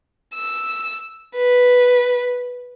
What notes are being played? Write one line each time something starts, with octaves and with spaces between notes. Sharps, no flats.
E6
B4